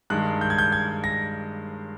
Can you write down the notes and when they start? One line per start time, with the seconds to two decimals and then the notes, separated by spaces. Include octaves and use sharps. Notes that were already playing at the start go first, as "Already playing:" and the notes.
0.10 G2 D#3 G#3 F#6
0.41 G6
0.50 G#6
0.58 G6
0.72 G#6
1.04 A#6